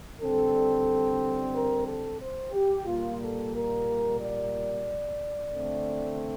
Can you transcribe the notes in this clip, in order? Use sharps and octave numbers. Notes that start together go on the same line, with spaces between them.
D3 G3 C4 A4
A#4
A4
C5
G4
A#2 G3 A#3 F4
A4
A#4
D5
D3 A3 C4